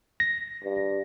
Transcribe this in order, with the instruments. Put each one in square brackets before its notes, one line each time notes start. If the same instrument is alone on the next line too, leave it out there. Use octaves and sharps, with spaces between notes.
[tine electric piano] A#6
[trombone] G2